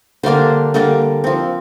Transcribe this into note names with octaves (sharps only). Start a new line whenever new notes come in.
D3 G3 A#3 D4 C5
D3 G3 A#3 D4
F3 C4